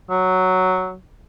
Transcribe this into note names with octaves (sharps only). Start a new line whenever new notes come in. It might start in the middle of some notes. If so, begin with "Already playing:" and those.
F#3